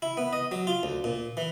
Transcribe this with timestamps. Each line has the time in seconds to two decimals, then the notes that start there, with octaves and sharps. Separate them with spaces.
0.02 E4
0.17 B3
0.33 D#5
0.51 F#3
0.67 F4
0.83 D2
1.04 A#2
1.37 E3